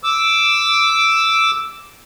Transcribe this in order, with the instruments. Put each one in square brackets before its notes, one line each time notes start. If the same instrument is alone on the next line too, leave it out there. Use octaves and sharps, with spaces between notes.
[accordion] D6 E6